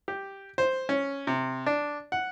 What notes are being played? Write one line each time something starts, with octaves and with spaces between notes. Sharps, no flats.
G4
C5
C#4
C3
D4
F#5